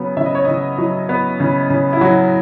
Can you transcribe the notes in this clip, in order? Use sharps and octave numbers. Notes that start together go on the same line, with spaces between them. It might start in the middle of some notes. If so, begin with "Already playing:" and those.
Already playing: C#3 F#3 B3
C#3 E5
D#5
C#5
C#3 D#5
F#3
B3
C#3
C#3
E4
F#3 F#4